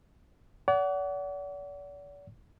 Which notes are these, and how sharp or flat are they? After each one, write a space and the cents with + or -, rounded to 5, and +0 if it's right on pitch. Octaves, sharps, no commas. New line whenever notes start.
D5 -40 F#5 +20